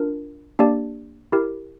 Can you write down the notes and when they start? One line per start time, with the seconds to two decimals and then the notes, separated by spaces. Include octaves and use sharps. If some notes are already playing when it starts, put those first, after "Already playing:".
Already playing: D4 F4 A#4
0.59 A#3 D4 G4 D5 A5
1.32 E4 G4 A#4